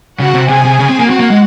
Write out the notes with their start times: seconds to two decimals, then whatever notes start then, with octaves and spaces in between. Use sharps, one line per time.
0.19 C#3 F#4 F#5
0.34 C3
0.49 C3 G#4 G#5
0.65 C3
0.79 C#3
0.89 C4
1.00 A#3
1.09 C4 F#4 F#5
1.20 A#3
1.30 G#3